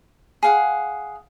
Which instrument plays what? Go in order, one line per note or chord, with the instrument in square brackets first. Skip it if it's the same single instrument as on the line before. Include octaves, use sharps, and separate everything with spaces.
[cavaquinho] G#4 F5 F#5